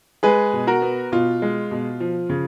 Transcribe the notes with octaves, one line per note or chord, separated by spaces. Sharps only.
G#3 G#4 B4
B2
F#4 A#4
B3
B2 F4
G#3
B2
F3
C#3